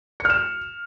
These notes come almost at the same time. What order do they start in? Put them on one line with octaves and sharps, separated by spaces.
C#7 F6 E7